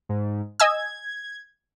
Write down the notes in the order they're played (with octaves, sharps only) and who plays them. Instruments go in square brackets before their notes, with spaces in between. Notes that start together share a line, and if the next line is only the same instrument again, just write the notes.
[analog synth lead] G#2
[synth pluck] D#5 G#5 E6 [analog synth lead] G#6